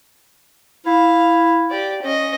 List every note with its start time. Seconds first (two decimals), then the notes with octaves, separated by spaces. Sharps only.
0.86 E4 F5
1.70 G4 D5
2.02 C#4 D#5